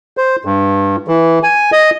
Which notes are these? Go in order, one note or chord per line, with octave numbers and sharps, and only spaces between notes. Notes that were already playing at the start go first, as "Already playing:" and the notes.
C5
G2
E3
G#5
D#5